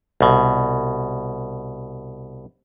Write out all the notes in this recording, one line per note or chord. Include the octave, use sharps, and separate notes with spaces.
C2 B2